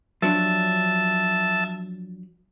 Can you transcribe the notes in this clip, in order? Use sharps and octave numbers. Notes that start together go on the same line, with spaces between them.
F3 F#3 D4 E5 A5